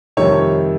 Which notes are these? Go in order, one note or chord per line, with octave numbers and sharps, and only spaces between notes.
F2 C3 D#3 G3 C#5